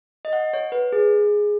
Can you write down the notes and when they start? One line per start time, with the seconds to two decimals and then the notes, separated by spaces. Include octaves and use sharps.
0.25 D#5
0.33 F#5
0.53 C#5
0.72 B4
0.92 G#4